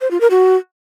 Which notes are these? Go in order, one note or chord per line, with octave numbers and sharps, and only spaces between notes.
C5
F4
A#4
F#4